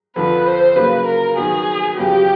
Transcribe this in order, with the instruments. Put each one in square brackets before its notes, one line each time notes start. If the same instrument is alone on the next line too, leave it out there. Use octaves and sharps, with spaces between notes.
[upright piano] F2 D3 F3 [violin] B4
[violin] C5
[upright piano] C#3 F#3 A#3 [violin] B4
[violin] A#4
[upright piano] D#3 F#3 B3 [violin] G#4
[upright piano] F2 C#3 F#3 B3 [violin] G4